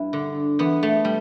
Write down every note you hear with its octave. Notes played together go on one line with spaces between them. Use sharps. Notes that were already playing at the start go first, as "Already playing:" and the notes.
Already playing: G2 E4
D3
E2 B3
A3
G3